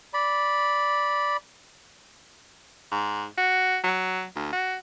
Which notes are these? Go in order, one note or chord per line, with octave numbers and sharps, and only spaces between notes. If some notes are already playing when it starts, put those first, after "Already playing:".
D5 B5
G#2
F#4
F#3
D2
F#4